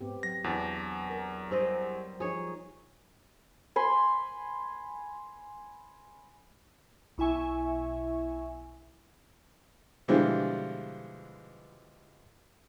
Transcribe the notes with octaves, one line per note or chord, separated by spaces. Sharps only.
G#2 B3 C4 G4
F#3 A#6
E2 D4 D5 F5
A#4
G3 C4 C5 D#5
F3 D#4 G#4 C#5
G#5 B5 C6
B1 E4 E5 G#5 C#6
B2 D3 E3 F3 G3 G#3